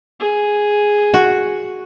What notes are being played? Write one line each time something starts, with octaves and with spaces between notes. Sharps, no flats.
G#4
F#4